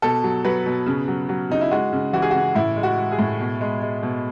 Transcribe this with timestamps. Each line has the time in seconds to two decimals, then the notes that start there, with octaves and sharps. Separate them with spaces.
0.02 B2 A4
0.24 F#3
0.44 F#3 B4
0.66 B2
0.86 C#3
1.08 F#3
1.29 F#3
1.50 C#3 D#4
1.61 E4
1.71 G#3 F#4
1.93 C#3
2.13 E3 F#4
2.22 G#4
2.31 C#3 F#4
2.55 A2 E4
2.76 G#3
2.83 F#4
2.97 G#3
3.12 G#4
3.19 A2
3.40 B2
3.61 G#3
3.82 G#3
4.03 B2